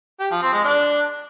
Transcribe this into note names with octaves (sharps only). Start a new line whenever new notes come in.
G4
F3
C4
G#3
D4